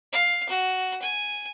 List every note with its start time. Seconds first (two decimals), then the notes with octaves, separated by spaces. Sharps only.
0.13 F5
0.49 F#4
1.02 G#5